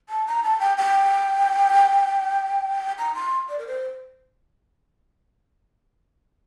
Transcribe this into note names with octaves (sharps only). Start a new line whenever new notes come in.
A5
A#5
A5
G5
G5
A#5
C6
D5
A#4
C5